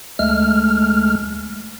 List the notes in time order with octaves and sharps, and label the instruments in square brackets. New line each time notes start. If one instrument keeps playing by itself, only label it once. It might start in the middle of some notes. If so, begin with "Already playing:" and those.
[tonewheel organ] D2 G#3 A3 F6